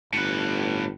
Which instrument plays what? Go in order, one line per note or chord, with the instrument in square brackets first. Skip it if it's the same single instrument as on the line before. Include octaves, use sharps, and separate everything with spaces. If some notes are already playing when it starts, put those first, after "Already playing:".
[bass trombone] G1 [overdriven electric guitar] A2 B4